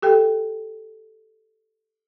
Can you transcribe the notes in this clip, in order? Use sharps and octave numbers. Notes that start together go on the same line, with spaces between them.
G4 A4 G5